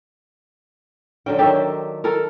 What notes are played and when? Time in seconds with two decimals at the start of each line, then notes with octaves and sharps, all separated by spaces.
1.26 D3 F#3 C#4 G5
1.39 D#3 F#3 G4 A4 D5 E5
2.04 A4 A#4